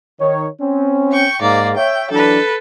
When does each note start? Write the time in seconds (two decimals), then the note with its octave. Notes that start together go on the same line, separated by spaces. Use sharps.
0.21 D#3 C#5
0.61 C4 C#4
1.12 G5 C#6
1.42 G#2 A#3 D5
1.77 C#5 E5 G5
2.11 E3 F#3 D4 A4 B4